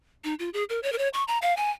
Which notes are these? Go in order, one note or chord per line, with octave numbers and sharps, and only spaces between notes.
D#4
F4
G#4
A#4
C#5
A#4
C#5
C#6
A#5
F5
G#5